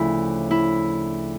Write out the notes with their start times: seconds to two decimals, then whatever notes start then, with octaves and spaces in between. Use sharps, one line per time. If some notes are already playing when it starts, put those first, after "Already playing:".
Already playing: D2 C#3 F3 E4
0.51 E4